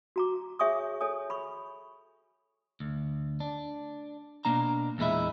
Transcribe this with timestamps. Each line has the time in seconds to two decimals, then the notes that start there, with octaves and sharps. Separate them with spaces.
0.16 F#4 A#5 D6
0.59 G#4 C#5 E5 G#5 C#6 D#6
1.01 A4 C#5 G#5 D#6
1.30 B5 C#6
2.80 D2
3.40 D4
4.45 B2 A#3 D4 A#5
4.98 E2 A#2 G#3 E4 E5